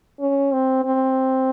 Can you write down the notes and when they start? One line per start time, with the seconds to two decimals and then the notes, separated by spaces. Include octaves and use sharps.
0.20 C#4
0.53 C4
0.85 C4